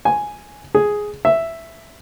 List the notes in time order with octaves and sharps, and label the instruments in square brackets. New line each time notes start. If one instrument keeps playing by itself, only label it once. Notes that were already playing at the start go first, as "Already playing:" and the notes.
[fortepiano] G#5
G#4
E5